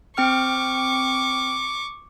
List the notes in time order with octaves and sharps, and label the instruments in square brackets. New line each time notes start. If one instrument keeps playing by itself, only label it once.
[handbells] C4 G5 F6 [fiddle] C#6 D6